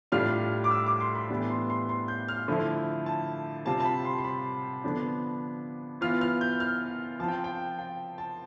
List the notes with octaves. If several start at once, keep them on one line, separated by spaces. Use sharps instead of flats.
A2 G3 D4 F4 F6
D6
E6
D6
C6
B5
A2 E3 G3 B3 D4
C6
C6
C6
G6
F6
D3 F3 A3 E4
A5
C3 G3 C4 F4 A5
A5
B5
C6
C6
B5
D3 F3 B3 D4
E3 B3 F4 F6
F6
G6
F6
F3 C4 F4 A5
G5
G5
G5
A5